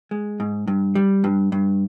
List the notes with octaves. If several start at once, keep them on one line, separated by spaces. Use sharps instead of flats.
G#3
G#2
G2
G3
G2
G2